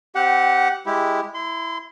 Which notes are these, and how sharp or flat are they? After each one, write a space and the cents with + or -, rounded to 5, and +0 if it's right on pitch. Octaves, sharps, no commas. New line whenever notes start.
C4 -10 G4 -20 F#5 +0
G#3 -5 E4 +0 G4 +0
E4 +0 C6 -30